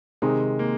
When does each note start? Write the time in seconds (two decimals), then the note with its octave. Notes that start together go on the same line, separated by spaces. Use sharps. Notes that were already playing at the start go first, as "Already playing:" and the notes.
0.22 C3 D#3 G#3 C4 D#4 G#4
0.59 A#3